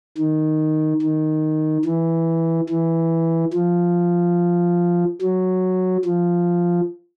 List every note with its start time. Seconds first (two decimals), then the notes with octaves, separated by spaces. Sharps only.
0.18 D#3
1.02 D#3
1.85 E3
2.70 E3
3.54 F3
5.21 F#3
6.05 F3